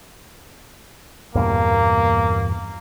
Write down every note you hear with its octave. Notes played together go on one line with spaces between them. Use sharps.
E2 G2 A#2 A#3